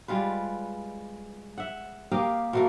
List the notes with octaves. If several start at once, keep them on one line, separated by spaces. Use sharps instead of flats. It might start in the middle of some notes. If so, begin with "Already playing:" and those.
G3 G#3 F4 B4
E5 F#5
A#3 G4 D#5 F5
B2 A3 A#3